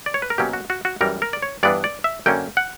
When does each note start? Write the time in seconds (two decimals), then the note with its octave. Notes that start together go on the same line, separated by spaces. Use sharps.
0.06 D5
0.14 C#5
0.22 B4
0.30 A#4
0.38 B2 F#3 A#3 C#4 G4
0.53 F#4
0.70 F#4
0.85 F#4
1.01 F#2 E3 G3 A#4
1.22 A#4
1.33 D5
1.42 C#5
1.63 G2 E3 B3 D4 D5
1.84 D5
2.04 E5
2.26 F#2 D3 A#3 C#4 G5
2.57 F#5